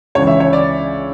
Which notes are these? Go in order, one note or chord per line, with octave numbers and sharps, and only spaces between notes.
C#2 C#3 E3 C#5
E5
C#5
D5